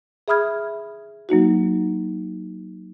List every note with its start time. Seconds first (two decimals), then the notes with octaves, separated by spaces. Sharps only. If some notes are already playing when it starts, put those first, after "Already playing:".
0.28 G#4 E5 B5 D#6 F6 G#6
1.29 F#3 A#3 D#4 F#4